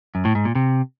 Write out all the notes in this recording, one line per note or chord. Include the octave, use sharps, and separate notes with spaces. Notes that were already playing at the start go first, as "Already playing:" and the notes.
F#2
A2
G#2
A#2
C3